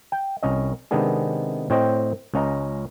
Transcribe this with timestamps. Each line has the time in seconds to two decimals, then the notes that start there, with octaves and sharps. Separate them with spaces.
0.12 G5
0.43 C2 C#4 D#5
0.91 C3 D#3 G#3 B3 D4 G#4
1.70 A2 C4 C5 C#5 D#5 G5
2.34 C#2 C#4 D#5 A#5